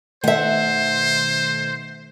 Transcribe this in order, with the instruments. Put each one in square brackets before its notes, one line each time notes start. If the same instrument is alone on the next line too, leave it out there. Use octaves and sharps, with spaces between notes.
[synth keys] B2 D#3 A3 [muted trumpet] C5 [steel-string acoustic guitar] E5 F#5